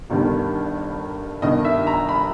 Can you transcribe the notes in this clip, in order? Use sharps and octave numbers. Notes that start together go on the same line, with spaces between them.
G1 G2 D#3 G3
G1 G2 D#3 D#5
E5
A#5
B5